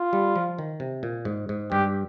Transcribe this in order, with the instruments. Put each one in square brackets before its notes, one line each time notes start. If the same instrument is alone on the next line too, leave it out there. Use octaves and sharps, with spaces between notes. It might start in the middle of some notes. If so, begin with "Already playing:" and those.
Already playing: [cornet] F4
[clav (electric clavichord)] G3
F3
D#3
C3
A#2
G#2
G#2
[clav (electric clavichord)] G2 [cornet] G4